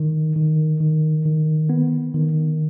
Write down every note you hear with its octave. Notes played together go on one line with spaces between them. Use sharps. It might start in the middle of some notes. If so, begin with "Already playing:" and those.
Already playing: D#3
D#3
D#3
D#3
B3
D#3